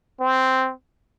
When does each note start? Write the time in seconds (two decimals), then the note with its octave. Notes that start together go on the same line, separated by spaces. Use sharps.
0.20 C4